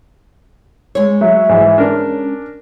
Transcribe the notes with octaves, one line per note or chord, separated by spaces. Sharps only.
G#3 C#5
F#3 E5
G#2 E3
C#4 D4 A#4